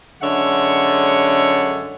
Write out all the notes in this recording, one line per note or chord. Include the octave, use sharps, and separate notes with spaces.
F#2 D3 G#3 C#5 E5 F#5